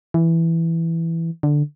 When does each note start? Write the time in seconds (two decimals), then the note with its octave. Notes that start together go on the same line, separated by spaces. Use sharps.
0.14 E3
1.43 D3